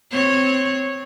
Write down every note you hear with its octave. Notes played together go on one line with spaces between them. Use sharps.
C4 C#5